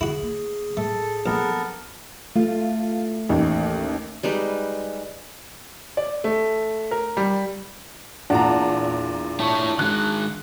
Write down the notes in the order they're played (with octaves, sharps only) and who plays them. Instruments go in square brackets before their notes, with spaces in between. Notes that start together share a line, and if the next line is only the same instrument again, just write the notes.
[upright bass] D3 [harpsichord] E4 F#4 [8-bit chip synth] G#4
[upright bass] A#3
[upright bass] A2 [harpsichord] A3 [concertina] A4
[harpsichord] A#1 [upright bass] F#3 A#3 [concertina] B3 A4 A#4
[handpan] A3 [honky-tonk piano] F4
[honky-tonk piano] A1 D#2
[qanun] G3 G#3 D#4 B4
[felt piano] D5
A3
A#4
G3
[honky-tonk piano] E2 A#2 [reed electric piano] D4 [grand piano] F#5 A5 A#5
[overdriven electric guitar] E4 C#5 [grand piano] A5 C#6
[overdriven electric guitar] D#3 G#3 [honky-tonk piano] F#6